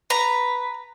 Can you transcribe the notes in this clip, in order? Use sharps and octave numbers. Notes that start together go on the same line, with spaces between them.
B4 A#5